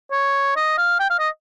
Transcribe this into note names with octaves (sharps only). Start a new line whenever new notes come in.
C#5
D#5
F5
G5
F5
D#5